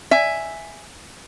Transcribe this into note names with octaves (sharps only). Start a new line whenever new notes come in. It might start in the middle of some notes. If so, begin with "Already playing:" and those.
E5 G#5